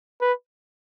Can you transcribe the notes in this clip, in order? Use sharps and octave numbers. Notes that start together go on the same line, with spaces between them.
B4